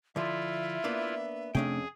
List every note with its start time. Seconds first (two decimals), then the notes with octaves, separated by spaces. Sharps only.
0.16 D3 F3 E4 F4 E5
0.84 A#3 B3 D4
1.55 F2 C3 A3 C#4 D4 G#4 G5